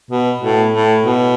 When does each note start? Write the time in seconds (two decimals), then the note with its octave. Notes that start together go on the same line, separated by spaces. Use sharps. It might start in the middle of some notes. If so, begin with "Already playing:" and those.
0.11 B2
0.41 A2
0.72 A2
1.03 B2